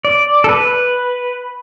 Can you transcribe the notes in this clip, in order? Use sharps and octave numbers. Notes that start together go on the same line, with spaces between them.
D5
A4
B4